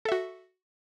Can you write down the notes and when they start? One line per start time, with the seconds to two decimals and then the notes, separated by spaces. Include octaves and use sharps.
0.05 A4
0.09 E5
0.12 F#4